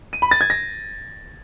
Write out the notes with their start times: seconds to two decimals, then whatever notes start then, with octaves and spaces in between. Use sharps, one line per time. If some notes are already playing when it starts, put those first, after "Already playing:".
0.13 D#7
0.22 B5
0.31 A6
0.41 G#6
0.50 A#6